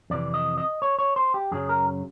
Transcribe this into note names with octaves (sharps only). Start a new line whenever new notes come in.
F2 C3 E3 D5
D#5
D#5
C#5
C#5
C5
G4
F#2 C#3 F#3 G#4
A#4